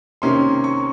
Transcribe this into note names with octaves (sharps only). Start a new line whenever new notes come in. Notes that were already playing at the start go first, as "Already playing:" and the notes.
C3 D#3 A#3 C#4 C6
C#6